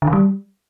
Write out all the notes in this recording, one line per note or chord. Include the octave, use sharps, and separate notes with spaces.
D3
D#3
G3